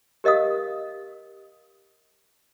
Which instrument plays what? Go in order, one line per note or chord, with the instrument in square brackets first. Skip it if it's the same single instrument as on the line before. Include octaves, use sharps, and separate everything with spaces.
[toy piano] G4 A#4 D#5 F5 D#6